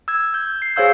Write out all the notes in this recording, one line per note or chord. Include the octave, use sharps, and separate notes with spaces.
E6 G#6
G6
C7
G#4 C5 C#5 F5 E6 G6